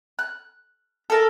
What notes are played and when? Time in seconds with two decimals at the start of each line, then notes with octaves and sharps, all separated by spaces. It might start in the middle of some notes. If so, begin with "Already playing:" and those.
0.19 F#6
1.10 A4 A#4 A5